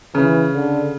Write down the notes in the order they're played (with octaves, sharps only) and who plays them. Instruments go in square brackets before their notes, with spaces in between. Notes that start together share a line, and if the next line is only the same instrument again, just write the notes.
[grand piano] C#3 [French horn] E3
[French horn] D3